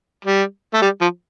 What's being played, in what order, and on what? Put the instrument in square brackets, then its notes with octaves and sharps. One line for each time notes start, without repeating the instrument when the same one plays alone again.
[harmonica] G3
A3
G3
F3